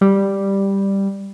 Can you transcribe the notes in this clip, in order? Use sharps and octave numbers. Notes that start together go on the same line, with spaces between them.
G3